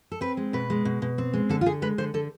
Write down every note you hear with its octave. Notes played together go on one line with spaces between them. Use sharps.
A4
C4 B4
G#3
B2 B4
G#3
B2
B2
C4
G#3
D3 A4
F4
D3 G#4
G#3 B4
D3 C5
D3 A4